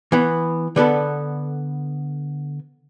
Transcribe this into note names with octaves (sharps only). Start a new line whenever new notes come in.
E3 B3
D3 B3 A4 B4